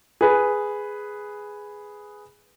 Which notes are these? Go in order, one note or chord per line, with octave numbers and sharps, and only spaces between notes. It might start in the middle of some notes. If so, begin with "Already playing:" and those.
G#4 B4